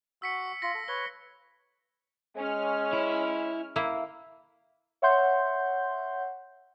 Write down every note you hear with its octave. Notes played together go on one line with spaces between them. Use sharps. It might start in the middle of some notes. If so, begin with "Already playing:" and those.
F#4 E6 B6 C#7
F4 A#6
A4
B4 C#5 G7
G#3 C#4 F6
E4
A#3 E4
C#5 E5 F#5 C6 G6